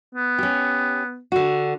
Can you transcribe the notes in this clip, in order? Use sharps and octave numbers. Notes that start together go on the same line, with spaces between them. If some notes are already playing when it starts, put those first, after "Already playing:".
B3
C#4 G4
D3 F#4